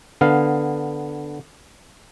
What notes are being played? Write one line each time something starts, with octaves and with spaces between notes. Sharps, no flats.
D3 B3 F5